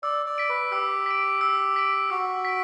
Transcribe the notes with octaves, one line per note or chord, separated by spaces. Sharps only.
D5 E6
D5
B6 D7
B4
G4 E6
B6 D7
E6
B6 D7
F#4 E6
B6 D7